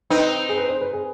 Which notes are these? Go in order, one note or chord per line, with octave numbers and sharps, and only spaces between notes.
C4 D#4 B4
G#4
B4
C5
B4
G#4